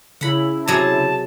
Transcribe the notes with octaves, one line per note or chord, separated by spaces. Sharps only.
C#3 E4 F#5 B5
C3 F#3 G#4 A5